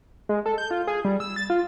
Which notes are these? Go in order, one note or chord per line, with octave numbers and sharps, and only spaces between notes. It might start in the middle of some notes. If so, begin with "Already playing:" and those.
G#3
A4
G6
F4
G#4
G3
E6
A6
F4